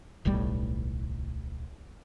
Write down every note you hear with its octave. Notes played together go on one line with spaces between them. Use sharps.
D1 B1 A2 G3